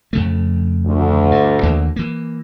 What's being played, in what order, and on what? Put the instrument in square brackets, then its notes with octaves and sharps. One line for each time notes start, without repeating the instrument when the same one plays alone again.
[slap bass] F2 C#3 A3
[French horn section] D2
[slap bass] G2
D#2 E3 A#3
E3 A#3